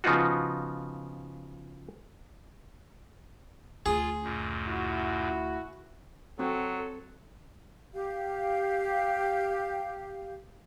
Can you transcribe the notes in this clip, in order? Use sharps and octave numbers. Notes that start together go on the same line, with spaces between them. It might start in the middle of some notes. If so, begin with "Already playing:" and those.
C#3 F3 B3 D#4 F4 F#4
D2 F4 G#4
F#2 A#2
E4 F#4
F#3 C4 F#4 A4
G4 F5